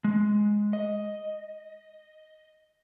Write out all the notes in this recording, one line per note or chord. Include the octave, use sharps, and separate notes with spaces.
G#3
D#5